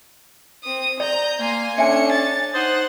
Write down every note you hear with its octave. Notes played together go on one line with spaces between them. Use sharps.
C4 D#6
D5 A#5 G6
A#3 G#5 C6
C#4 D4 A4 C#5 E5 G#5 C#7
A6
D#4 C5 F#5 D#6